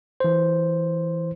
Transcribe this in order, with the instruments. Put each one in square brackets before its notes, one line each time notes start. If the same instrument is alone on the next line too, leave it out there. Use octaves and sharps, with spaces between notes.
[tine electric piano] E3 C5